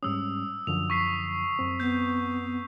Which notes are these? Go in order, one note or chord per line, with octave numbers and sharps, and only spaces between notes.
G#2 G3 C#4 D#6 E6
F#2 D3 F3 F7
C#6 B6 C7
F#2 C4
B3 G6